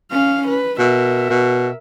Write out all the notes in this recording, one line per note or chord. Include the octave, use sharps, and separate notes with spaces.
C#4 F5
B4
B2 A#4 E5
B2